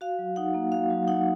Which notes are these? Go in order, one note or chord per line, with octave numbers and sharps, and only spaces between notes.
F#4 F5
F#3
D#4 F#5
A#3
F#4 F5
F#3
D#4 F#5